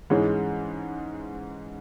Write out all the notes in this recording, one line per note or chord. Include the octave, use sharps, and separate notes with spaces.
G#2 E3 G#3 C#4 G#4